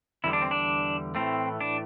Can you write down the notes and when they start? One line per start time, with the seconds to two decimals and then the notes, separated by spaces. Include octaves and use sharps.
0.24 E2 D3 G3 E4
0.33 D4
0.42 C4
0.51 D4
1.15 A2 E3 A3 C4
1.61 D4